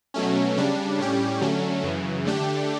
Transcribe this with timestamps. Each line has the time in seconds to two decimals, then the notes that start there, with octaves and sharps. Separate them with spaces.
0.14 B2 F#3 A3 C#4
0.56 C#3 G3 D4
0.98 A2 G3 C#4 G4
1.41 D3 F#3 A3 C#4
1.83 F#2 C#3 E3
2.25 D3 A3 D4 G4